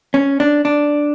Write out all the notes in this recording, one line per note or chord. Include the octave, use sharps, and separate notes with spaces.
C#4
D4
D4